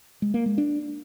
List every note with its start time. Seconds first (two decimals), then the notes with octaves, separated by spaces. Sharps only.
0.22 G#3
0.34 A#3
0.46 G#3
0.58 D4